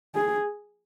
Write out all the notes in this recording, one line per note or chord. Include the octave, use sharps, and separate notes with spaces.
G#4